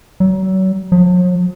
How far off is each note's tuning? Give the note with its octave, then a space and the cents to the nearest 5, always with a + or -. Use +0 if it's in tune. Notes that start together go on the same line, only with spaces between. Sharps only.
F#3 +35
F#3 -45